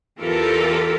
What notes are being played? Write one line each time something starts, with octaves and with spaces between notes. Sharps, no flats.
E2 E3 F4 G4 A4 A#4